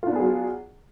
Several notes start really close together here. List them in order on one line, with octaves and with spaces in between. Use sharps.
F4 D4 B3 G#4 F#3